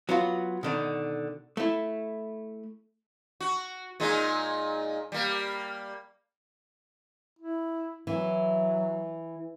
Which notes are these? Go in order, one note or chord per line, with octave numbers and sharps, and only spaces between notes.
F#3 B3 F4 F#4
B2 D3 D#3
A3 E4
F#4
A#2 G#3 D#4
G3 A#3
E4
E3 F#3